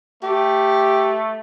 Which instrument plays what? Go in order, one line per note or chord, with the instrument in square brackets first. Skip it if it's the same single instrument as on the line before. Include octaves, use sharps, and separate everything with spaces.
[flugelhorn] A3 [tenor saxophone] G4